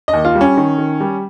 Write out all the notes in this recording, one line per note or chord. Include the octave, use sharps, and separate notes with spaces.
D#5
D#2
F4
G3
C#4
D#3
D#3
G3